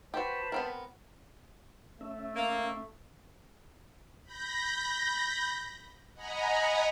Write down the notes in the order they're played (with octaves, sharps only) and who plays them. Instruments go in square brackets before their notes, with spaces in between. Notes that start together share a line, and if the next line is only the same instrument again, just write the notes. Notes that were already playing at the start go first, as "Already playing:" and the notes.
[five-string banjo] F#4 G4 [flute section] B4 C5 A5
[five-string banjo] B3 C4 A#4
[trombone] A3 [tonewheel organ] C#4 E5
[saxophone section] A#3
[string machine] B5 G6 A#6
D#5 F#5 G#5 A#5 B5